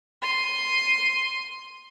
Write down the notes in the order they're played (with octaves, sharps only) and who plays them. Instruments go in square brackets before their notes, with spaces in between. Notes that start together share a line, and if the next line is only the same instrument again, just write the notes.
[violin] C6 D#7